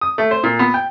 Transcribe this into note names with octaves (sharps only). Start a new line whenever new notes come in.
D#6
A3
C5
A#2
B3
G5